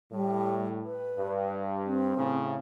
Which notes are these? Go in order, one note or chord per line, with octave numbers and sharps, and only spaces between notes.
A2 G3
B4
G2
C4
A2 C#3